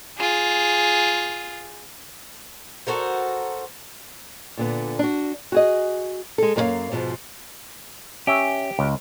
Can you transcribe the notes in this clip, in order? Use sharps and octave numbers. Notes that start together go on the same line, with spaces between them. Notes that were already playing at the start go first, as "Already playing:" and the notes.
F4 G#4
F#4 A4 A#4 C5
A#2 D3 B3
D4 F#4
F#4 G#4 D#5
G#3 A4
F#2 A#3 D#4 E4 C#5 F5
G#2 B2 F3 G#3
C#4 G4 E5
C#2